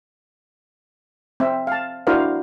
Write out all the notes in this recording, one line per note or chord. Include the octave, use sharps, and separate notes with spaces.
C4 E5
F5 A5
D4 E4 F#4 A#4 C5 F5